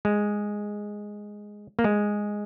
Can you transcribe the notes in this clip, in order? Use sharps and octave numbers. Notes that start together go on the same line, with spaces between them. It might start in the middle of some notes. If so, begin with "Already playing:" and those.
G#3
A#3
G#3